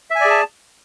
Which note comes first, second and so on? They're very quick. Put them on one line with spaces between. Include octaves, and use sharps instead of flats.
E5 G#5 D5 G#4 A5